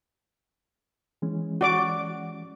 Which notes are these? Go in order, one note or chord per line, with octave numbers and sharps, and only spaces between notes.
E3 G#3 C#4
F#4 D5 D6